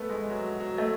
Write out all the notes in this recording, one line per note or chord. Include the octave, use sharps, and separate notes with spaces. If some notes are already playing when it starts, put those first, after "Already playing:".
Already playing: A3 B3
G#3
F#3
F#3
A3